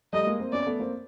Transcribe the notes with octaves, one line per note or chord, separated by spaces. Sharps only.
G3 A3 D#5
G#3 A#3
A#3 C4
B3 C#4 D5
A3 B3
A#3 C4